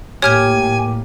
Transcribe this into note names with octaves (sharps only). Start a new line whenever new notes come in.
A2 A#3 G4 C#5 G#5 F6 G#6